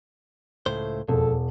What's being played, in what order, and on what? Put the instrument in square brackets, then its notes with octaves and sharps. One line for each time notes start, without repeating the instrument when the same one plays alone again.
[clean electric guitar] C#2 A2 C5 [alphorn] A3
[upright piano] E1 [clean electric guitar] F2 [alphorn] A4